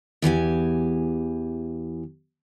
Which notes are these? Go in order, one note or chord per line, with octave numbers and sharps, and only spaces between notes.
E2 E3 G4 G#5